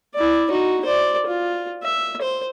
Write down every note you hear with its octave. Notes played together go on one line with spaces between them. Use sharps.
E4 D5
D#4 F#4
C5 D5
F4
E5
C5